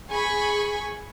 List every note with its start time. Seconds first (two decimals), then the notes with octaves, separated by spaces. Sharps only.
0.11 G#4 G#5 B5 C#6